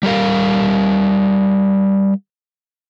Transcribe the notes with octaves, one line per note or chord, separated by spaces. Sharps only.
G3 G4 A#4 F5